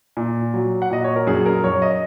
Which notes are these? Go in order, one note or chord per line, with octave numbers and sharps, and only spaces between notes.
A#2
F#3
F#5
A#2 D#5
C#5
A#4
F#2 G#4
A#4
F#2 C#5
D#5